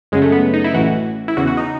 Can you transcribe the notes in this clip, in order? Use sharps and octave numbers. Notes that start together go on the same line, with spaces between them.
F#2 C#3 F#3 G#3
A3
B3
D#4
E4
A1 A2 E3 F#4
E4
E2 C#3 E3 F#4
F#4
D#4